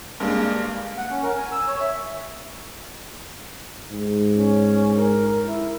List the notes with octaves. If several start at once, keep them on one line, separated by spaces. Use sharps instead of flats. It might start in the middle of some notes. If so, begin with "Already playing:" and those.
G2 G#3 A#3
F#5
C#4
A#4
G#5
E6
C#5
E5
G#2
C#4
A#4
E4